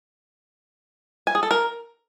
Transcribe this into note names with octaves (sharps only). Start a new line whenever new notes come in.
G#5
G#4
A4
A#4